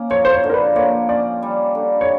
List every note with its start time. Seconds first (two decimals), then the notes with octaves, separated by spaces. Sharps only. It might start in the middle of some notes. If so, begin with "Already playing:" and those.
Already playing: A#3 C#4
0.10 F3 C#5
0.25 C5
0.32 C#5
0.44 D3
0.50 A#4
0.54 B4
0.76 A#3 C#5
1.09 C#4 D5
1.42 G3
1.75 D3
2.01 C#5